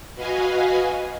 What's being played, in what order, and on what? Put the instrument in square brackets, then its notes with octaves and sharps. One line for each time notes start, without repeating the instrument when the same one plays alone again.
[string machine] F#4 B4 D#5 F5 G#5